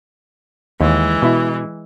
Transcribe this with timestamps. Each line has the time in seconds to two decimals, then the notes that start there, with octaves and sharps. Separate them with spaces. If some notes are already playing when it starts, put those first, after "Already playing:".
0.81 D#2 E3 G#3
1.22 B2 E4